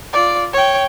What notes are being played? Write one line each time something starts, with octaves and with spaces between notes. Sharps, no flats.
F4 D5
C#5 G5